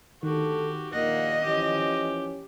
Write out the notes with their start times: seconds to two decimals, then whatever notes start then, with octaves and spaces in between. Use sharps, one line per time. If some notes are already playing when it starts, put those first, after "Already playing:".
0.23 D2 D#3 F#4 G4 A4
0.93 A#1 D#2 A#2 A#3 D#5 F#5
1.44 E3 F3 C#4 G4